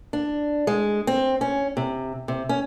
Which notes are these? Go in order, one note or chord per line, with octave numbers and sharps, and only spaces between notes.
D4
G#3
C4
C#4
C3
C3
C#4